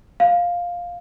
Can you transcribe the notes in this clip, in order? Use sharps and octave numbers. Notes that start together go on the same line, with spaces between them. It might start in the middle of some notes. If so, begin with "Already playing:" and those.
F5